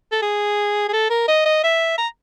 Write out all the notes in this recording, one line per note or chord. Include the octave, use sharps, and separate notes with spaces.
A4
G#4
G#4
A4
A#4
D#5
D#5
E5
A#5